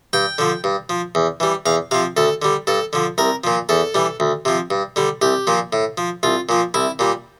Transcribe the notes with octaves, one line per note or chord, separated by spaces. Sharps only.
G2 G5
D3 F3
G2
F3
E2
E3 G3
E2 F5
C3 F3 F5
D2 A4
D3 G3
G2 A4
D3 F3
C2 A#4
A#2 F3
E2 A4
E3 G3
D2
C3 F3
G2
D3 G3
C2 G4
A#2 F3
A2
F3
C2 F4
A#2 F3
C2 E4
A#2 G3